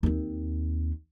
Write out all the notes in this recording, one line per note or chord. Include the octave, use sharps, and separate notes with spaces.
D#2 C4